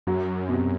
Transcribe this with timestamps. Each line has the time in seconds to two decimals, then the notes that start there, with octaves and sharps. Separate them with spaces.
0.07 F#2 F#3
0.48 B2
0.53 C3